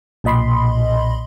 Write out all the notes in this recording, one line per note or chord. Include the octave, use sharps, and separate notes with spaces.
B1 A#2 D#5 B5 C6